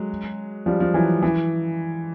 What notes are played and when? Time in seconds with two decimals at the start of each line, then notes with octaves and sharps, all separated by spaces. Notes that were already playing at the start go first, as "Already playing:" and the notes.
Already playing: F#3 G#3
0.66 F3 G3
0.80 F3
0.94 E3 F#3
1.22 E3